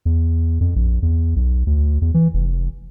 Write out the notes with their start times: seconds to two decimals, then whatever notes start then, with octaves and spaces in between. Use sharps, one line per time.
0.05 E2
0.61 F2
0.76 A#1
1.02 E2
1.36 B1
1.67 D2
2.02 E2
2.14 E3
2.34 F1